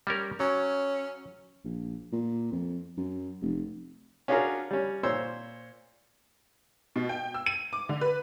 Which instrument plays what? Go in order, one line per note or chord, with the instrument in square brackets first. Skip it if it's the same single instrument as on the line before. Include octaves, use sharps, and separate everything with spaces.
[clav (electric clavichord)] G3 C#4 A#4
[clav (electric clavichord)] F#3 [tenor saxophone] C#4
[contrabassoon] A#1
A#2
F2
F#2
F1
[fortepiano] C#4 D4 F4 F#4 G#4 A#4
G3 C#4
A#2 C5 C#5 E6
[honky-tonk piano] B2
G5
E6
D#7
D6
D3
B4